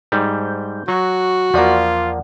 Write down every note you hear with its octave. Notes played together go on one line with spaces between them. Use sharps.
G#2 G3 G6
F#3 F#4
E2 F3 A#3 F4 D5 F#5